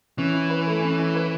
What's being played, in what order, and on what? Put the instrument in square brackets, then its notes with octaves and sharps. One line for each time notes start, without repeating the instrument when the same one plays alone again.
[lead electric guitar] E3 [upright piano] C#4
[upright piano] E4
B4
A3
C#4
E4
B4